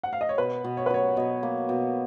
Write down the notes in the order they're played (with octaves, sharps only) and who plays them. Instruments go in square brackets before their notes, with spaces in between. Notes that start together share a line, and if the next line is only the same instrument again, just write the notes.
[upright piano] F#5
F5
D#5
C#5
[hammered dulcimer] B2 [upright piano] B4
[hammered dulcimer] B2
[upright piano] C#5
B4
[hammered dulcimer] F#3 [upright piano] C#5
[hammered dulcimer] B2 [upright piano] D#5
[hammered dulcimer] A#3
B2